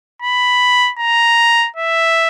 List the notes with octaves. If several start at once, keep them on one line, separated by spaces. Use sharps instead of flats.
B5
A#5
E5